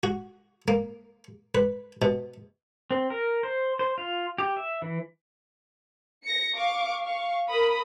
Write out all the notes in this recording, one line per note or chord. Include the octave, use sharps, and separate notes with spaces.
F#4
A#3
B4
B2
C4
A#4
C5
C5
F4
G4
E5
E3
A#6 C#7
F5 C#6 D6
F5 C#6
A#4 B5 D#6